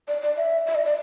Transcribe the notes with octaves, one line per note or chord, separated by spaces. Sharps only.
D5
D5
E5
E5
D5
D5